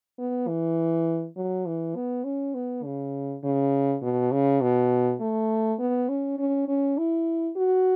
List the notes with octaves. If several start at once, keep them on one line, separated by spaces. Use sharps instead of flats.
B3
E3
F#3
E3
B3
C#4
B3
C#3
C#3
B2
C#3
B2
A3
B3
C#4
C#4
C#4
E4
F#4